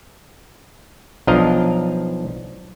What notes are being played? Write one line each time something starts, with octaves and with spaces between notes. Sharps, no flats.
B1 F3 D4 D#5 F5 A#5